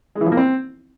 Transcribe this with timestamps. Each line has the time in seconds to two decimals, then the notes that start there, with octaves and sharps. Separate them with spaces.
0.15 G#3
0.21 E3
0.26 F3
0.32 A#3
0.37 C4